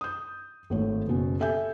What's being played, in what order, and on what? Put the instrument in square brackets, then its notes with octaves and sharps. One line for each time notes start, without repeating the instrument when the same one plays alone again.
[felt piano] D#6 G6
G#1 A3 C#5
F#1 B2 C#4
G4 A4 E5 G#5 G6